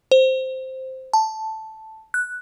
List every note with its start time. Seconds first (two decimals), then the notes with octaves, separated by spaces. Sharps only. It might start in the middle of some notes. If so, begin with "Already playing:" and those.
0.11 C5
1.13 A5
2.14 F#6